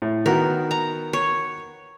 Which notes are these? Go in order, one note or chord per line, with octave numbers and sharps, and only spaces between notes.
A2
D#3 B3 F#4 A#4
A#5
C#5